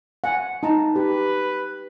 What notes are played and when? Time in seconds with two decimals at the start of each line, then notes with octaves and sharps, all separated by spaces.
0.24 F#5 G#5
0.63 D#4 A5 A#5
0.96 G4 B4